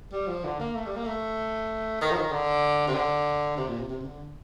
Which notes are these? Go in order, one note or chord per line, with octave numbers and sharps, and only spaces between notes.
G3
F3
D3
A#3
A3
G3
A#3
A3
D#3
F3
D#3
D3
C3
D3
C3
A#2
C3
C3
C3
D3